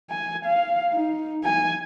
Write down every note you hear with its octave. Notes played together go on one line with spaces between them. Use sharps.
G#5
F5
D#4
G#5